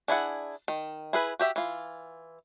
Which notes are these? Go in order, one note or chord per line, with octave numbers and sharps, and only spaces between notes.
D4 E4 G#4 F#5
D#3
E4 G#4 B4
F#4 G4 E5
E3 F4